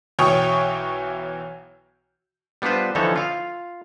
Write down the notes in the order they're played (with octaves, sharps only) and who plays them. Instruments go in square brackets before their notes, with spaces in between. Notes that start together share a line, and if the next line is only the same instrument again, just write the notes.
[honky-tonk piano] B1 E3 C#5 G5 C#6 D#6
[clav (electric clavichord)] G3 B3 D4 F4 B4 C5
D3 E3 F3 D#4 A4 C#5
F4 F5